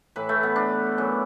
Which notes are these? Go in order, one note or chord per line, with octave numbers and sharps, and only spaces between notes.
A2 E3 B4
A3
B3
D4
F#2 E3